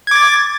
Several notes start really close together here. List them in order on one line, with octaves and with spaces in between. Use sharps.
G#6 D6 A6